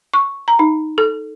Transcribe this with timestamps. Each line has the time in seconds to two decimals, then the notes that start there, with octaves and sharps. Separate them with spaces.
0.14 C#6
0.48 A#5
0.59 D#4
0.98 A4